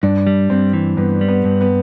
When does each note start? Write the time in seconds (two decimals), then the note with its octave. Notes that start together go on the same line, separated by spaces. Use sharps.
0.03 G2 D4
0.27 G3
0.50 G2 C4
0.73 E3
0.97 G2 B3
1.21 G3
1.28 B3
1.45 G2
1.61 B3